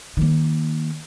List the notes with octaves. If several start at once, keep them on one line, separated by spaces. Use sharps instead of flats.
D#3 A#3